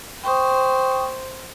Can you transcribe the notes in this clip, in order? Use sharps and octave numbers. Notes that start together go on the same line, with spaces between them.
C5 G5 C#6 D#6